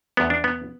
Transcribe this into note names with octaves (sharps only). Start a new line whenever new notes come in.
E2 D3 A3 B3
D4
B3